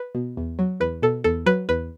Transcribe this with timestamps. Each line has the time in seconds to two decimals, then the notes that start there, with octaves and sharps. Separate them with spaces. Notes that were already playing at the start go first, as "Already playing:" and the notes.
Already playing: B4
0.15 B2
0.37 E2
0.59 F#3
0.80 E2 B4
1.02 B2 A4
1.24 E2 A4
1.46 F#3 B4
1.69 E2 B4